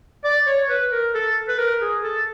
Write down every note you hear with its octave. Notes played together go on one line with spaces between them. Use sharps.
D5
C#5
B4
A#4
A4
B4
A#4
G#4
A4